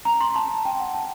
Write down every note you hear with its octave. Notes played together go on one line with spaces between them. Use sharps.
A#5
C6
A5
G5
F#5
A5